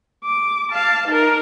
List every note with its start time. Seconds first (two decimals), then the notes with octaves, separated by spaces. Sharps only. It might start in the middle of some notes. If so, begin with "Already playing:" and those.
0.24 D6
0.72 F5 A5
1.08 D#4 A#4